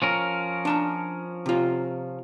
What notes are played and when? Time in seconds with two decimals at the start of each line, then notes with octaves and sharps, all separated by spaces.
0.02 F3 C#4 A#4
0.65 D4 A5 A#5
1.46 C3 F4